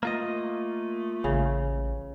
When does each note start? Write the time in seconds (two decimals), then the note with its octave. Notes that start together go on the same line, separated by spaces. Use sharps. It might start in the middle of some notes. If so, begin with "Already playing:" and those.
0.03 A3 A#3 F4 D#5
1.24 A1 C#3